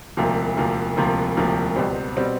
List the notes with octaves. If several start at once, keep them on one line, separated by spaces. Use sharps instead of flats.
E1 D2 C3 F3 A#3
E1 D2 C3 F3 A#3
E1 D2 C3 F3 A#3
E1 D2 C3 F3 A#3
C#2 B2 G3 C4
B2 G3 C4